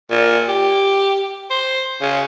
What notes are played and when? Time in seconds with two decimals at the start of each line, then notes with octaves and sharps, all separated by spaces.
0.11 A#2
0.48 G4
1.51 C5
2.02 C#3